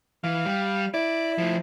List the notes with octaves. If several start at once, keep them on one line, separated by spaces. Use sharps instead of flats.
E3 F5
G3
E4 D5
F3 A3